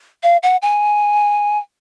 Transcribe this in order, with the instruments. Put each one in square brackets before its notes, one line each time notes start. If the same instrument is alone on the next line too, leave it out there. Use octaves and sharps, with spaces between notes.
[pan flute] F5
F#5
G#5